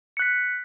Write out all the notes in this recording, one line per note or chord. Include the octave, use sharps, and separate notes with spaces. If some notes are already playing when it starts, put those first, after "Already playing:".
F#6 B6 C#7